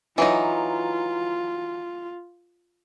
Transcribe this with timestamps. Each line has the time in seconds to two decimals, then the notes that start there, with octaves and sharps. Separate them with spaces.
0.18 E3 F#3 D#4 F4